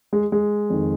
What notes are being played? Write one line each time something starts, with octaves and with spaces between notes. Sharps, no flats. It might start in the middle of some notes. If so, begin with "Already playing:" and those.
G#3
G#3
F2 D#3